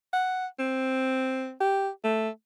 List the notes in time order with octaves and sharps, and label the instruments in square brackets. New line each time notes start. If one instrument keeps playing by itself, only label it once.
[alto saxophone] F#5
C4
G4
A3